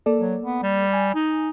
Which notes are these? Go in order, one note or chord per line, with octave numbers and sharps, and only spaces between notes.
A#3 A4 D5
F#3
B3
G3
G#5
D#4